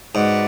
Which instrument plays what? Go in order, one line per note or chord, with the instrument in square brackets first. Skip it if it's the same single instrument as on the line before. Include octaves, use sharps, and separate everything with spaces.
[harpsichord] G#2 [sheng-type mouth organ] F#4 B4 D5 F#5